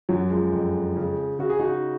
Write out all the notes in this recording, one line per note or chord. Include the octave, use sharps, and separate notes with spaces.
F#2 F#3
F3 G#3
F2
C#3
C#3 F#4
G#4
D#4 F#4